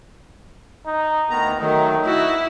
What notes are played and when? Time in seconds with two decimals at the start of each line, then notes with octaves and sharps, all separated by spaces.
0.86 D#4
1.30 D2 D#3 B3 A#5
1.60 D#3 F#3 A3 D#4
2.06 E4 F#4